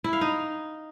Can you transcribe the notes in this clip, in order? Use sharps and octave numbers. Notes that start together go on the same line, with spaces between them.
E4
F5
D#4